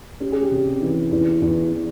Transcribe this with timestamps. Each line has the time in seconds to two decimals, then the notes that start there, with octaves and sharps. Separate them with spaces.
0.20 C#4 G4
0.32 G#4
0.42 G4
0.51 C3
0.81 E3
1.12 E2
1.42 E2
1.72 E3